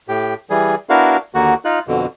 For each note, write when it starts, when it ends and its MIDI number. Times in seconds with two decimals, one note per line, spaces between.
0.08 0.34 45
0.08 0.34 67
0.50 0.75 52
0.50 0.75 55
0.50 0.75 68
0.90 1.17 59
0.90 1.17 62
0.90 1.17 64
0.90 1.17 66
0.90 1.17 70
0.90 1.17 77
1.34 1.54 39
1.34 1.54 50
1.34 1.54 58
1.34 1.54 66
1.65 1.79 63
1.65 1.79 65
1.65 1.79 90
1.87 2.06 41
1.87 2.06 47
1.87 2.06 50